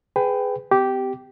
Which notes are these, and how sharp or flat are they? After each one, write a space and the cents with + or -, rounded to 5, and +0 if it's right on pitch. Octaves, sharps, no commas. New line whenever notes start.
G#4 +0 B4 +20 G5 +0
C4 -45 G4 -10